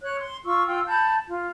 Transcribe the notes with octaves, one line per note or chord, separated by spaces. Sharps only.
C#5 F#6
C6
F4 C#6 E6
F4 G5 E6
A5 B5 G6
F4